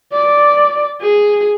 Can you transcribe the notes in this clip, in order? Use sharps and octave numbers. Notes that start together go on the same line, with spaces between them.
D5
G#4